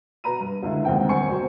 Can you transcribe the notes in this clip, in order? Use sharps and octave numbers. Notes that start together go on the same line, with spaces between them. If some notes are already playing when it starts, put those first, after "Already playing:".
B2 B4 A#5 B5 D#7
G2
C#2 D3 E4
D#2 G#2 C4 F#5 G5
D#1 C5 F#5 G#5 C#6 C#7
B2 F#3 C4 C5